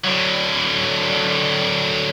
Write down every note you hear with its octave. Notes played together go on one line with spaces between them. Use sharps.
D3 F#3